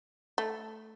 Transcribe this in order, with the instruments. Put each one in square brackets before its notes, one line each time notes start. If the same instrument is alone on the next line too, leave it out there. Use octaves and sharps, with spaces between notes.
[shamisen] A3